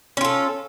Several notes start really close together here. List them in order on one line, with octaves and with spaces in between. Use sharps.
C#4 F4 A4